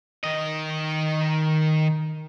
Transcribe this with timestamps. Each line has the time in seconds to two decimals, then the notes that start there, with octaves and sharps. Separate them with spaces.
0.24 D#3 D#5